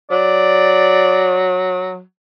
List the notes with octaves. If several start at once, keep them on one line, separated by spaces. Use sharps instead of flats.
F#3 D5